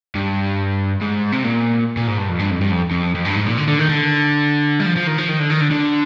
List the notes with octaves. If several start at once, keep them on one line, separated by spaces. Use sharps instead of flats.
G2
G#2
C3
A#2
A#2
G#2
G2
F2
G2
F2
G2
F2
F2
F2
G2
G#2
A#2
D3
D3
D#3
D3
G3
F3
F3
D#3
F3
D#3
D3
D#3
D3
D3